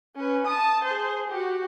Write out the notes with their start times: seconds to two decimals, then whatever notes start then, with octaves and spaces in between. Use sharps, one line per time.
0.16 C#4 B4
0.46 A5 D#6
0.84 G#4 C5
1.27 F#4 G4